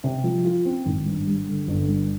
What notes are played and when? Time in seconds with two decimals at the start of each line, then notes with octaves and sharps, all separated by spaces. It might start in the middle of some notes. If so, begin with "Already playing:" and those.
0.04 C3
0.24 F3
0.45 F4
0.65 C4
0.86 G#1
1.06 G2
1.26 G3
1.47 D3
1.68 G1
1.88 G2